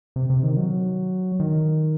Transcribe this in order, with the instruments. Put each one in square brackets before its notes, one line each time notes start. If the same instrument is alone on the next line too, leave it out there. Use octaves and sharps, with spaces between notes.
[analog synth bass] C3
C3
D#3
F#3
D#3